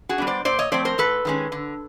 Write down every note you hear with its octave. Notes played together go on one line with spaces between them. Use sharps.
F#4 G#4
G3 B3 D4
C5 D5
A#2 C5 D5
C#5 D#5
F3 A3 C4 C5 D5
A#4 C5
G#2 A4 B4
D#3 G#3 C#4
D3